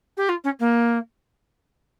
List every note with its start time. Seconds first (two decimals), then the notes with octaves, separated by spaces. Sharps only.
0.17 G4
0.29 F4
0.44 C#4
0.60 A#3